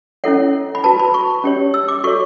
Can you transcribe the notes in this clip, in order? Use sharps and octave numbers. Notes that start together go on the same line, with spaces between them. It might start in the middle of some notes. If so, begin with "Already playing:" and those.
C#4 E4 A4 C#5 F#5
B5
F#4 B4 A5
B5
C#6
C#4 G4 C#5
E6
D6
F#4 A4 C#5 C#6